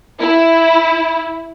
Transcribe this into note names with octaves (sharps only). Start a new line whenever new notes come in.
E4